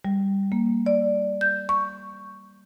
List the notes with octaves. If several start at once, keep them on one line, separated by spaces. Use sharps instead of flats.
G3
A#3
D5
G6
C#6